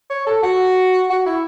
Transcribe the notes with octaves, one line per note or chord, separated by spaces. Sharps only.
C#5
A4
F#4
F#4
E4